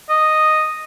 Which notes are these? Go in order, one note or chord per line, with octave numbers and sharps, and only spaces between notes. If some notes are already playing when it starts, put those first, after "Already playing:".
D#5